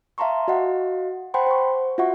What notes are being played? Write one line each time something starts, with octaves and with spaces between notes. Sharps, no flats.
E5 F5 A5 A#5 C6 C#6
F#4 D#5 F5 F#5
C5 F#5 G5 A5 B5 C6
C5 C#6
F4 F#4 E5 F#5 C#6